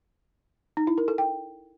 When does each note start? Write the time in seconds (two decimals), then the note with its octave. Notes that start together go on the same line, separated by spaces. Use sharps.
0.77 D#4
0.87 E4
0.98 A#4
1.08 A4
1.18 G5